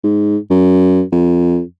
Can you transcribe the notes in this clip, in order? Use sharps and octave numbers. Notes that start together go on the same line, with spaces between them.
G#2
F#2
F2